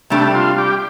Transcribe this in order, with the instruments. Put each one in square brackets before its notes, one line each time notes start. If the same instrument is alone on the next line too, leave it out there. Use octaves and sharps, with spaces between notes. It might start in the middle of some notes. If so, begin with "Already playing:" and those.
[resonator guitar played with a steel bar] C3 G3 D4 [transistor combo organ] A3
[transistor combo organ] F4
G4